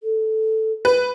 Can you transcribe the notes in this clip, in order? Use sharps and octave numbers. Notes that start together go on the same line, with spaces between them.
A4
B4